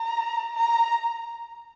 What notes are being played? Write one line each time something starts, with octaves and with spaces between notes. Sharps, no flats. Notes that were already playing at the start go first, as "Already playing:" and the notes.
Already playing: A#5
A#5